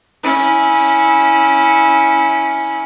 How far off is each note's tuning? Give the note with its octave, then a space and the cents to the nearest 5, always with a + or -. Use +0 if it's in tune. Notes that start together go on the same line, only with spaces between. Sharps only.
C#4 +0 E4 -25